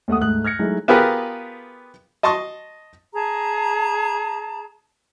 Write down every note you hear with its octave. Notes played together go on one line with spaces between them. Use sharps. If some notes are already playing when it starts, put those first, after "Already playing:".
D#2 A3 F#5 D#6
D2 G#2 A3 F#6
F6 G#6 A#6 C#7
F#3 G#3 A3 D#4 E4
B3 F4 G4 G#4 A#4 B4
D#5 A5 C6 C#6 D#6
G#4 A5 A#5